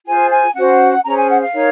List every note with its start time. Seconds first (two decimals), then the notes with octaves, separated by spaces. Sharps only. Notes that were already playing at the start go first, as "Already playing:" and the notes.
0.06 F4 G#4 C5 G#5
0.31 G#5
0.55 C#4 F#4 C5 F#5
1.04 C#4 G#4 C5 A#5
1.17 G#5
1.29 F#5
1.41 F5
1.53 D#4 A#4 C#5